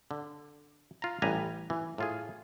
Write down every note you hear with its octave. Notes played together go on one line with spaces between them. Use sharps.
D3
F4 A#5
A1 G3 B4 G#5 A#5
E3
A2 F4 G#4